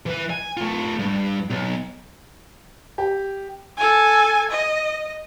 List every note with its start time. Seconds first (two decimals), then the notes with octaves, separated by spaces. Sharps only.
0.06 E3 B4
0.30 G#5
0.57 A3 F4
0.99 G2
1.50 B1
2.98 G4
3.77 A4 G#5
4.51 D#5